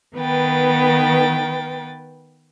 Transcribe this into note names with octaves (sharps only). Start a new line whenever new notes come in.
D#3 B3 B4 G5 A6